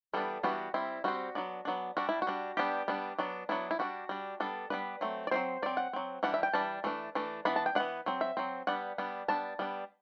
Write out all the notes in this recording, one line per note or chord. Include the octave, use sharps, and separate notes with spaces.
E3 G3 B3 D4 A4
E3 G3 B3 D4 F#4
G3 C4 E4
G3 C4 F#4
F#3 B3 D4
F#3 B3 D4
G3 D4 F#4
E4
F#4
G3 D4
G3 B3 D4 G4
G3 B3 D4
F#3 B3 D4
F#3 B3 D4 E4
E4
G3 D4 F#4
G3 D4
G3 B3 D4 A4
G3 B3 D4 B4
F#3 A3 C4
D5
F#3 A3 C4 C5
F#3 C4 D5
F#5
F#3 C4
E3 G3 D4 F#5
E5
G5
E3 G3 D4 A5
E3 A3 D4
E3 A3 D4
E3 B3 D4 B5
A5
G5
E3 B3 D4 F#5
F#3 C4
E5
F#3 C4
G3 B3 D4 F#5
G3 B3 D4
G3 B3 D4 A5
G3 B3 D4